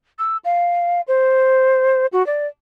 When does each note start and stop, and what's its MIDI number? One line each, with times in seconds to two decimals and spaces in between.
0.19 0.37 88
0.44 1.01 77
1.07 2.06 72
2.12 2.25 66
2.26 2.47 74